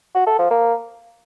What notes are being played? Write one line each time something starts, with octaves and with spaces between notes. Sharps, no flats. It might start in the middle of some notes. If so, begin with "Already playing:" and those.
F#4
A4
F3
A#3